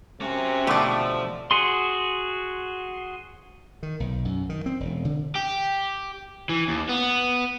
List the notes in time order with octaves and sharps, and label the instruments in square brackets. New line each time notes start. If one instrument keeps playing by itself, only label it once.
[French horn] C3 [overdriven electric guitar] C#4 F#4
[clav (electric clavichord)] B2 D3 [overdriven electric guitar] F3 [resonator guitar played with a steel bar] A3 D5
[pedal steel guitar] F#4 G#4 C6
[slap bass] D#3
B1
F#2
D#3
C4
E1
D3
[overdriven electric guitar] G4
E3
D#2
B3